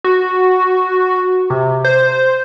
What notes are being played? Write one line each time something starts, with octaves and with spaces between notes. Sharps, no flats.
F#4
C3
C5